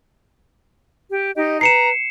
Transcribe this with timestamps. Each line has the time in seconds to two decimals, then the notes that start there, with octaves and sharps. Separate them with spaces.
1.10 G4
1.35 D#4 G4 D#5
1.61 B4 A#5 C7 C#7 E7